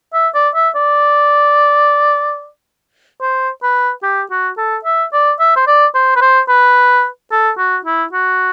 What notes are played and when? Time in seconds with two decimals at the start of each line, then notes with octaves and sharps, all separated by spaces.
0.14 E5
0.35 D5
0.55 E5
0.75 D5
3.21 C5
3.63 B4
4.03 G4
4.31 F#4
4.58 A4
4.85 E5
5.13 D5
5.40 E5
5.56 C5
5.67 D5
5.95 C5
6.16 B4
6.21 C5
6.49 B4
7.31 A4
7.58 F#4
7.85 E4
8.13 F#4